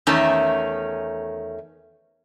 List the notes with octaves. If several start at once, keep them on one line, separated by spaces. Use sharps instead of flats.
E2 D#3 A3 C#4 A5